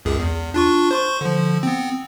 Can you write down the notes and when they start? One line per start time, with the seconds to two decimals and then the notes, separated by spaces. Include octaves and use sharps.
0.05 C#2 F#2 G#4
0.19 E2
0.54 D4 F4 C#6
0.91 C5 C6 C#6
1.21 D3 F3
1.63 B3 C4